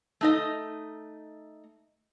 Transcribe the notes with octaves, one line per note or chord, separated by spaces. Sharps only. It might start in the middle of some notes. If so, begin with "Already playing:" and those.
A3 D#4 D#5